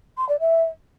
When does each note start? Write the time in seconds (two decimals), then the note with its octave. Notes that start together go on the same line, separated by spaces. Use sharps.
0.17 C6
0.29 D5
0.40 E5